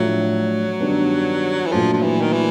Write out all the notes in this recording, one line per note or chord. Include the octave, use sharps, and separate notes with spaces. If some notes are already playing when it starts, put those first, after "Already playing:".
Already playing: A2 F3 F#3 A3 D4 F4
G2 D#3 G3 B3 D4
E3
A#2 F3 F#3 A3 D4 F#4
F3
E3
D#3
E3